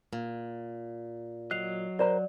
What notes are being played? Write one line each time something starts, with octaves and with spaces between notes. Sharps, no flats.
A#2
F#3 D#5 F#6 C7 F7
A#4 C5 D5 A#5